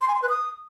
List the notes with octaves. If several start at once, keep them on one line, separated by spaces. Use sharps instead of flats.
C6
G#5
C6
B4
D#6